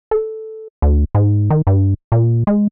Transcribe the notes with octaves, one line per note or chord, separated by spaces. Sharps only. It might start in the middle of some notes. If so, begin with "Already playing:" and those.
A4
D2
G#2
D#3
G2
A#2
G#3